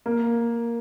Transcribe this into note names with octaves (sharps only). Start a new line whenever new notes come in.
A#3